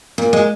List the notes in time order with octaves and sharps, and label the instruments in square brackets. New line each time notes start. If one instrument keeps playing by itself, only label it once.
[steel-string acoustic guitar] A#2
G#3